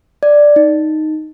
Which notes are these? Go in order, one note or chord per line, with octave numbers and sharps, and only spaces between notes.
D5
D#4